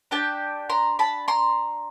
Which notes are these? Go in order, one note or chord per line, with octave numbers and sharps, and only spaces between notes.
D4 G4 G5 A5
A#5 C6
A5 B5
A#5 C6